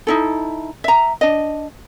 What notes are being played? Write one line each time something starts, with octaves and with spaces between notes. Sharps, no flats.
D#4 E4 A4
E5 A#5
D4 D#5